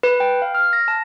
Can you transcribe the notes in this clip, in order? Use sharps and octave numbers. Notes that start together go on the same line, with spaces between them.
B4
G5
F5
F6
A#6
A5